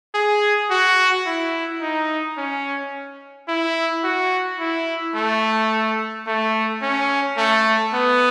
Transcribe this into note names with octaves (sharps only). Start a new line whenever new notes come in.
G#4
F#4
E4
D#4
C#4
E4
F#4
E4
A3
A3
C#4
A3
B3